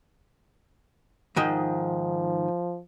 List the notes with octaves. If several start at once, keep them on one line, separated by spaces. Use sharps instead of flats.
G#2 D#3 F3 D#5